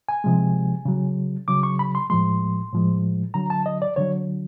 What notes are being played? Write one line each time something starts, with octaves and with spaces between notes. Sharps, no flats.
G#5
C3 F3 G#3
C#3 F#3
C#3 F#3 D6
C#6
B5
C6
A2 F3 G#3 C6
A2 F3 G#3
D3 F#3 A#5
A5
D#5
D5
D3 F#3 C#5